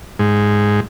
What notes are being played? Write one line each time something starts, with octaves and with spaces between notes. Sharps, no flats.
G#2